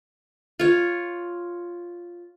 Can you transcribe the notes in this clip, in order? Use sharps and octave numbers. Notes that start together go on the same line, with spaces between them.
F4 C#5